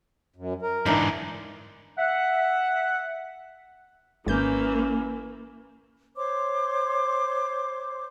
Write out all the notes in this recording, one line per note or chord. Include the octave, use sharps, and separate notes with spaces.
F#2
A#4
G#2 D3 E3 D4 D#4
E5 F#5
G#1 E3 A#3 C#4 G6
C5 C#5 C6 D6